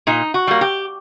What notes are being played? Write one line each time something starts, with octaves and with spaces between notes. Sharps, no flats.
A#2 D#4
F#4
G3 A#3
G4